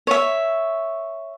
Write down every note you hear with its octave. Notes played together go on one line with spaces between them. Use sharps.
C#5 E5